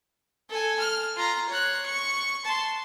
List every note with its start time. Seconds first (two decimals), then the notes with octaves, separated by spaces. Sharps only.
0.50 A4 G#5
0.80 F6
1.16 F4 A#5
1.49 C#5 F#6
1.86 C#6
2.45 A5 C6